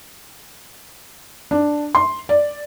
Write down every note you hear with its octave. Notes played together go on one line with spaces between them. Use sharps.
D4
C6
D5